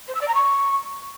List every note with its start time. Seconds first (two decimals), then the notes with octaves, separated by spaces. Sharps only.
0.08 C5
0.15 E6
0.21 D5
0.28 A#5
0.35 C#6